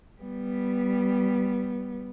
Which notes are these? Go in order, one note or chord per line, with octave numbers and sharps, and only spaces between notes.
G3 B3